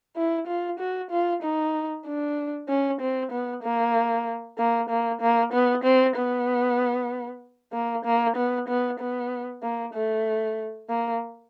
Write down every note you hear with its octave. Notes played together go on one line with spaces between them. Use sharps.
E4
F4
F#4
F4
D#4
D4
C#4
C4
B3
A#3
A#3
A#3
A#3
B3
C4
B3
A#3
A#3
B3
B3
B3
A#3
A3
A#3